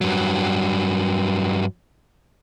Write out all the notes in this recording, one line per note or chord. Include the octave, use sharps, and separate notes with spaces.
G2 F#3